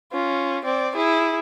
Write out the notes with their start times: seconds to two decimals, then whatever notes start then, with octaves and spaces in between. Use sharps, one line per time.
0.13 C#4 F4
0.65 C4 D5
0.96 E4 G#4